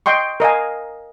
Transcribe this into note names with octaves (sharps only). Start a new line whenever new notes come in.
D#5 G5 C6 C#6
A#4 D#5 F5 G#5